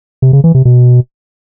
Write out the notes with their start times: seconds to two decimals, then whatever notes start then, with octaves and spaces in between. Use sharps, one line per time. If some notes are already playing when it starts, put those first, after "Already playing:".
0.22 C3
0.33 C#3
0.44 E3
0.55 C3
0.65 B2